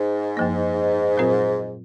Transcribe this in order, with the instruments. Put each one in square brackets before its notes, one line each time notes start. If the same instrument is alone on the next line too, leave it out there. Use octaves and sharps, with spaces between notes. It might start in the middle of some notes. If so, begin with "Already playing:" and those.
Already playing: [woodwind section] G#2
[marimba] F#2 F3 A#3
A#2 F#3 C4 F4 A#4